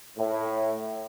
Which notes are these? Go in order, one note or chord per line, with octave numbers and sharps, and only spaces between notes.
A2